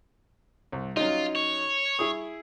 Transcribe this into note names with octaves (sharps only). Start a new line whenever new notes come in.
C2
F#3 C#4 D#4 F4
C#5
E4 G#4 D#6